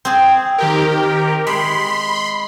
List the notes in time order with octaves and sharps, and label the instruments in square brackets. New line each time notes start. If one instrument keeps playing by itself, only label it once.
[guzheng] C4 G#4
[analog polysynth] D#3 G4 A#4
[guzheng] G#3 [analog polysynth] B5 C6